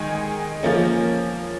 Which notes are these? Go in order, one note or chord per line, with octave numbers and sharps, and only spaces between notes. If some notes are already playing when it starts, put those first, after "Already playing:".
Already playing: D#3 G#3 D#4 G#5
F3 A#3 C#4